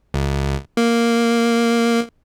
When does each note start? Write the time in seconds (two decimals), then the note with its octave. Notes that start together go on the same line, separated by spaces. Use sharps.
0.14 C#2
0.77 A#3